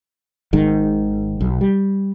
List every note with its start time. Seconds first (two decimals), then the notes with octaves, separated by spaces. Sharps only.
0.53 G#1 G#2 D#3
1.41 B1
1.61 G3